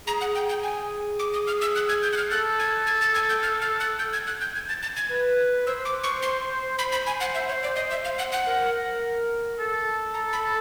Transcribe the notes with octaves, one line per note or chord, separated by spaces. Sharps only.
G#4 A#5
F#5
G5
G5
G#5
D6
D#6
F6
E6
F#6
G#6
G6
F#6
F6
A4 F#6
G#6
G#6
A6
G#6
G6
F6
F6
F#6
G6
G#6
F#6
G6
G#6
A6
A6
G#6
B4
C5 E6
D6
C#6
C6
C5 B5
B5
G#5
F#5
E5
C#5
D5
D#5
E5
F5
F#5
F#5
A#4
A4
A#5
B5